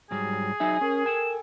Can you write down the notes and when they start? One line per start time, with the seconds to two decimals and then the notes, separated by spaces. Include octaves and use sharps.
0.11 G#2 F#3 G3 G#4
0.60 F#3 D#4 E5 G#5
0.81 C#4 A#4
1.06 A4 G5 G#5 E7